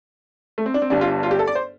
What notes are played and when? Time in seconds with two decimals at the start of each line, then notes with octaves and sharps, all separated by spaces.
0.58 A3
0.66 C4
0.74 D4
0.82 C4
0.90 G1 G2 G3 D4
1.01 F4
1.23 F4
1.31 G4
1.39 A4
1.47 D5
1.55 C5